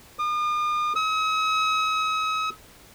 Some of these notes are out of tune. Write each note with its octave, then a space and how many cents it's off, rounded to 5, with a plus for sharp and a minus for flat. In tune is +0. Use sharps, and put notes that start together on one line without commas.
D#6 -45
D#6 +45